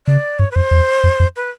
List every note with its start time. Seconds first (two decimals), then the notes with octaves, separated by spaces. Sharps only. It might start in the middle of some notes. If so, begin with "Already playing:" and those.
0.07 C#3 D5
0.39 G2 C#5
0.51 B4
0.55 F2 C5
0.71 E2
1.04 F2
1.20 F2
1.36 B4